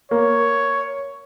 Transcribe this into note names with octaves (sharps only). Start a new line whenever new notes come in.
A#3 C#5